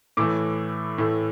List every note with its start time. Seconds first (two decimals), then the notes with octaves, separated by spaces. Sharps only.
0.17 A2 E3 A3 D6
0.98 A2 E3 A3